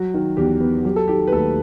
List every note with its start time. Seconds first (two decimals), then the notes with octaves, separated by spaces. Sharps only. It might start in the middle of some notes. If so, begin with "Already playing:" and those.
Already playing: F#3 F#4
0.14 D#3
0.37 E2 G4
0.61 B3
0.84 F#3 G4
0.96 A4
1.08 D#3 G4
1.27 B4
1.32 D#2 A3 A4